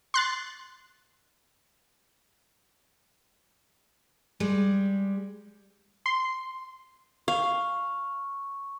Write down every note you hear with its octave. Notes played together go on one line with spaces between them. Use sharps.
C6 F#6 A6
G3 G#3
C6
F5 C#6